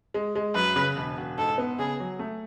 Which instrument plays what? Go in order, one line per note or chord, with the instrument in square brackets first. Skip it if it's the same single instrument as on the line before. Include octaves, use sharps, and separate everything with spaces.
[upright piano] G#3
G#3
[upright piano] F#2 [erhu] B4
[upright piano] C#3
E1
E1
[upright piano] G#2 [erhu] A4
[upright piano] B3
[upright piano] C#3 [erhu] G#4
[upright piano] F#3
A3